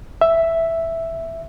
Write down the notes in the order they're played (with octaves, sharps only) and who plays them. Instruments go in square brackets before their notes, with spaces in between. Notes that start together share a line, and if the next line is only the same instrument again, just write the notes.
[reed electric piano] E5